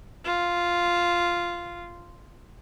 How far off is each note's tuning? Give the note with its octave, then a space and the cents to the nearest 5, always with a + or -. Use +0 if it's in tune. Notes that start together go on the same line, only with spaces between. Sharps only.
F4 -5